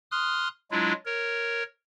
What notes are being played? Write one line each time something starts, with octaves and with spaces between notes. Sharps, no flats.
C6 D#6 F6 F#6
F#3 G#3 D4 E4 F4
A#4 C#5